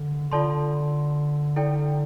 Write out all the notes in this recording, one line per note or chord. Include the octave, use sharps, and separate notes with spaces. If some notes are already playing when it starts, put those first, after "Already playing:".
Already playing: D3
D3 F4 A4 D5 A5 C6
E4 A4 D5 G5